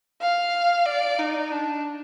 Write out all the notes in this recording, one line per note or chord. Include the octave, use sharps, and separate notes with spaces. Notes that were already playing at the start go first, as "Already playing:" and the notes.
F5
D5
D#4
D4